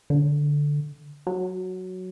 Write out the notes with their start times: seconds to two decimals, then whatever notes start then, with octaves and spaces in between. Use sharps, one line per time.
0.10 D3
1.27 F#3